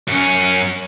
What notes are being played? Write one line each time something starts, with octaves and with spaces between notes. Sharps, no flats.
F#2 C#4